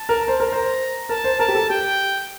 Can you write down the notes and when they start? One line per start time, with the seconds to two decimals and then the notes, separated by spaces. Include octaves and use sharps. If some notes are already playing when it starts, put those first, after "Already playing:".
Already playing: A5
0.09 A#4
0.28 C5
0.40 A#4
0.49 C5 A#5
1.09 A#4 A5
1.24 C5
1.39 A#4 A5
1.48 G4
1.55 A4
1.70 G4 G5